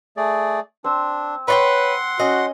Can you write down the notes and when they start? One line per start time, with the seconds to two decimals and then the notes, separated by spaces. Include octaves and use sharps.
0.17 A3 G#4 D5
0.84 C4 D4
1.48 B4 C#5 D5 F#5 G5 C6
2.20 C#4 F#4 D#5